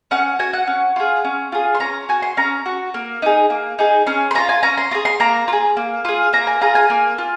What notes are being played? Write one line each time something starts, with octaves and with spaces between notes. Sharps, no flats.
C#4 F#5
F#4 G#5
F#5
C#4
F4 G#4
C#4
F4 G#4
C6
C#4 A#5
F#4 G#5
C6
C#4 A#5
F#4
A#3
D#4 G#4
A#3
D#4 G#4
C#4 C6
C6
F4 G#4 A#5
G#5
C#4 A#5
C6
F4 G#4 A#5
C6
A#3 A#5
F4
G#4
A#3
F4 G#4
A#3 A#5
G#5
F4 G#4 A#5
G#5
A#3
F4